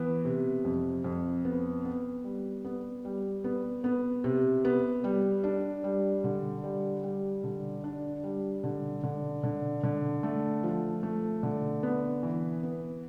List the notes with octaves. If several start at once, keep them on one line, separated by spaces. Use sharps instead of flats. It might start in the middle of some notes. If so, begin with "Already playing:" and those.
Already playing: E3 B3
C3
F2
F2
B3
B3
G3
B3
G3
B3
B3
C3
B3
G3
D4
G3
D3
G3
G3
D3
D4
G3
D3
D3
D3
D3
A3
F3
A3
D3
B3
E3
B3